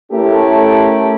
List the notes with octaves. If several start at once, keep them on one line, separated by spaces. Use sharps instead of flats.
A3 C#4 E4 G4 A4 A#4